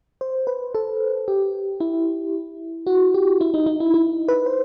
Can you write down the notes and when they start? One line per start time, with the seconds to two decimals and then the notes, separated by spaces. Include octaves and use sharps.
0.21 C5
0.47 B4
0.75 A4
1.28 G4
1.80 E4
2.87 F#4
3.14 G4
3.41 E4
3.54 D#4
3.66 D#4
3.80 E4
3.94 E4
4.28 B4
4.46 C5